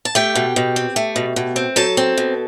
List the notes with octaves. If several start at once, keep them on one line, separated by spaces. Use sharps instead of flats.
A5
A3 G4 G5
B2
B2
C4
A3
B2
B2
C4
F#3 A4 A5
C4
B2